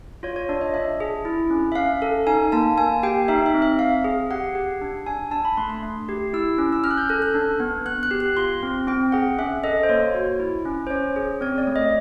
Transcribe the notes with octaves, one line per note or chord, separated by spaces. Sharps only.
F4 C#5
C#5
D4 D5
D#5
D4 E5
G#4
E4
C#4
E5
C#4 F5
A4
D#4 G#5
A#3 A5
A#3 G#5
G4 G5
D#4 E5
E5
C4
E5
C4 F5
G#4
G4 F#5
G4
D4
D4 G#5
D4 A5
B5
A3 C6
C6
A3
G4
E4 E6
C#4
E6
C#4 F6
F#6
G6
A4 F#6
F#6
D4
B3
B3 F#6
F#6
G4
F#6
F4 C6
C4
C4 G5
G#4 F#5
C#4 E5
A4 D#5
C5
A#3 C#5
F#4
E4
C#4
C5
C#4 C#5
G#4
C4 C#5
D5
A3
D#5